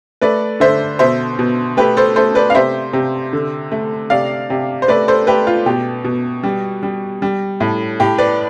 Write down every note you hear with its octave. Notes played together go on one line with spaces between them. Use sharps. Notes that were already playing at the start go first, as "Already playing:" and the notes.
A3 B4 D5
D3 C5 E5
B2 C5 E5
B2
A3 G4 B4
A4 C5
A3 A4 C5
B4 D5
F5
C3 C5 E5
C3
D3
A3
C3 D5 F5
C3
C5
A3 B4 D5
A4 C5
A3 G4 B4
F4
B2 G4
B2
G3
G3
G3
A2
A2 G4
B4 D5